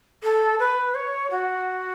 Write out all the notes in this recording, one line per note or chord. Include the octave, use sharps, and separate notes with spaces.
A4
B4
C#5
F#4